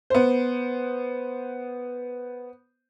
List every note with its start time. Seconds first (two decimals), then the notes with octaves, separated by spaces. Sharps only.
0.10 B3 C5